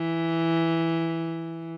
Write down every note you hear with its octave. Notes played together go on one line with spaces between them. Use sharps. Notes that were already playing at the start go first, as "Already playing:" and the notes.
Already playing: E3